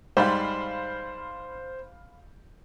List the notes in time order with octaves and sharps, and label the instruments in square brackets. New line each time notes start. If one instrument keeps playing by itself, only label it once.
[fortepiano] G#2 G3 [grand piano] C5 [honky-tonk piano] F5 B5 C6